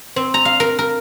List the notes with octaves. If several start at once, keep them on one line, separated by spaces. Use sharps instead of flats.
C4
A#5
F5
A#4
A#4